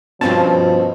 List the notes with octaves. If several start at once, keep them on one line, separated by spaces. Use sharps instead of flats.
G2 B2 F3 C4 C#4 A5